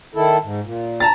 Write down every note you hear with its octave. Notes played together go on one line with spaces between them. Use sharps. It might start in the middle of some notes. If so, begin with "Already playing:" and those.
D#3 E4 A4
G#2
A#2
A5 A#5 A6